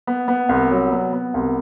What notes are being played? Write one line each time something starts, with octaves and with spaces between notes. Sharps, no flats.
B3
B3
C2
F#3
B3
B3
C2